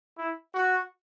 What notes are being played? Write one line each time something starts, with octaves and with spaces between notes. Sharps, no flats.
E4
F#4